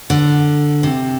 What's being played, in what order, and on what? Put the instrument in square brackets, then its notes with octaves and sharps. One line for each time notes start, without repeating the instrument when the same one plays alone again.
[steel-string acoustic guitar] D3
C3